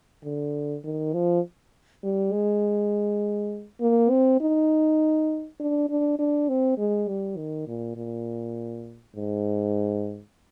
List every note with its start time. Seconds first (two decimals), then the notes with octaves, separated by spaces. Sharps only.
0.24 D3
0.84 D#3
1.13 F3
2.03 G3
2.32 G#3
3.81 A#3
4.10 C4
4.41 D#4
5.60 D4
5.90 D4
6.19 D4
6.49 C4
6.78 G#3
7.08 G3
7.37 D#3
7.67 A#2
7.96 A#2
9.16 G#2